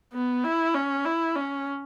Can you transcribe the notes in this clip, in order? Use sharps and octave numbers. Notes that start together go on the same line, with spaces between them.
B3
E4
C#4
E4
C#4